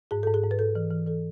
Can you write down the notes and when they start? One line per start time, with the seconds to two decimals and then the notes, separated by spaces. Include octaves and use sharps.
0.11 G#2 G#4
0.23 G#2 A4
0.34 G#4
0.43 G#2
0.51 B4
0.59 G#2 A4
0.75 E3
0.91 E3
1.07 E3 A4